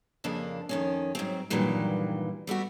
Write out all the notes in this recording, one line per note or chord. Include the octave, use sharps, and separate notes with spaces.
F2 C#3 A#3 D4
F2 D#3 C#4
G#2 F#3 C4
G2 A#2 D#3 E3 F#3 G3
G3 A3 B3 F#4